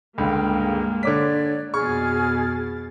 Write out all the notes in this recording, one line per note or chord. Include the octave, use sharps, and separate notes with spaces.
C#2 G2 D3 G#3 A#3 F5 G5
D3 C#5 D5 D6 B6
F2 B2 G#4 C#6 F6 G#6 A6